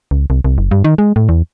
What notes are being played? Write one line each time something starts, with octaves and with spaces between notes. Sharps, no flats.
C#2
C2
C2
F#1
G2
D#3
G#3
A2
E2